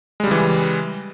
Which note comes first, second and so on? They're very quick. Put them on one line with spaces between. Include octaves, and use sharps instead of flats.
G#3 G3 C#3 E3